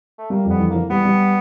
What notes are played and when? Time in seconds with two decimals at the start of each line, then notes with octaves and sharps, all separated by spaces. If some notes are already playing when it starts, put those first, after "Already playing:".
0.19 A3
0.30 G3 A#3
0.45 F2
0.50 B3
0.60 E3
0.70 E3 A#3
0.90 G3 B3
1.05 G3